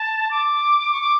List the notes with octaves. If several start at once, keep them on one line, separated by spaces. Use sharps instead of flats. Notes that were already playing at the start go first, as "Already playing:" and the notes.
Already playing: A5
D6
C#6
D6